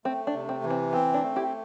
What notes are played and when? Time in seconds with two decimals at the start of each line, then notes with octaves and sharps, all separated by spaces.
0.05 A3 C4
0.27 D4
0.34 C3
0.49 C4
0.64 E3
0.70 C4
0.93 B3 C4
1.14 D4
1.22 A3
1.36 E4 G4